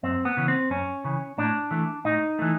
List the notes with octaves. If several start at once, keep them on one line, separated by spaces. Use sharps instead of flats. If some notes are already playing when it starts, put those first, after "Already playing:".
F#2 C4
B3
C#3 E3
C4
F#2 C#4
C#3 E3
A2 D4
E3 A3
A2 D#4
E3 A3